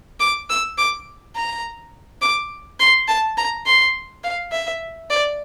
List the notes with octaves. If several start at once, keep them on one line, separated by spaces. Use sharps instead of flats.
D6
E6
D6
A#5
D6
C6
A5
A#5
C6
F5
E5
D5